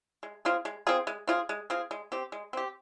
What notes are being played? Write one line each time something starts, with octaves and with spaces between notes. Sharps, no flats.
G#3
C4 F4 G#4
G#3
C4 F4 G#4
G#3
C4 F4 G#4
G#3
C4 F4 G#4
G#3
C4 G4
G#3
C4 G4